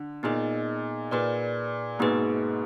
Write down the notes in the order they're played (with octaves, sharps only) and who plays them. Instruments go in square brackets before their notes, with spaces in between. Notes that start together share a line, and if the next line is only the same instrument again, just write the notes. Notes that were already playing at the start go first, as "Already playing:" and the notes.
Already playing: [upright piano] D3
[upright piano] A#2 [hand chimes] B3 D#4 G#4 D#5
[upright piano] A#2 [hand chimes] D#4 G#4 B4 D5
[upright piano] G#2 B2 [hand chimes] A#3 D#4 G#4 B4